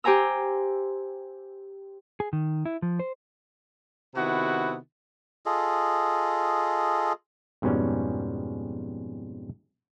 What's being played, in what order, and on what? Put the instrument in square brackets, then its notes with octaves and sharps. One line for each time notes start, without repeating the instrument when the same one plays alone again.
[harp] G4 C5 G#5 A#5 E6
[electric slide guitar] G#4
D#3
E4
F3
C5
[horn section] C3 D#3 B3 E4 F#4
[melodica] F4 G#4 A4 D#5
[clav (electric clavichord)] F2 G#2 B2 G3 C#4